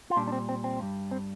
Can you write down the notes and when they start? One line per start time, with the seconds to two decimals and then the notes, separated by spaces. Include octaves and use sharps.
0.10 F4
0.16 A#2 G3 D4
0.28 D4
0.32 C4
0.49 C4
0.64 C4
0.79 G2 G3
1.11 C4